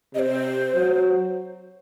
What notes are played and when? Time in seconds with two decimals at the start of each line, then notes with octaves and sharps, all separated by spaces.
0.15 C3 C5 D#5
0.75 F#3